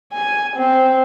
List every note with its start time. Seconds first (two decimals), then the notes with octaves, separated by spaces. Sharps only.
0.13 G#5
0.57 C4